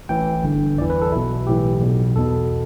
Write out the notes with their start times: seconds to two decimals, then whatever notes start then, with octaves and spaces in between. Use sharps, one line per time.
0.09 A1 A2 E3 G5
0.43 G1 G2 D3
0.78 E2 D5
0.81 E3
0.90 B4
1.02 A4
1.12 B1 B2 E4
1.47 B1 A2 E3 G4
1.81 B1 B2
2.16 E2 B2 A4